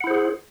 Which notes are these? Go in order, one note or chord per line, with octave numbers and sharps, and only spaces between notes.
E4 G#4 C5 F#5